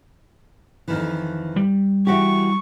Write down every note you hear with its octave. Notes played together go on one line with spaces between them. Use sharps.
F2 D#3 E3
G3
E3 F#4 G4 C#6